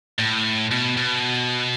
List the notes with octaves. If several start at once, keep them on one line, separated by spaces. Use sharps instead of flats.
A2
B2
B2